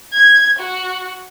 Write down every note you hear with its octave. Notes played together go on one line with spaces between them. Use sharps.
G#6
F#4